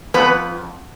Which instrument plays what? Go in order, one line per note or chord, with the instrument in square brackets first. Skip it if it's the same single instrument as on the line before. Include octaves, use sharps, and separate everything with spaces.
[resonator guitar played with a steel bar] F2 B3 B4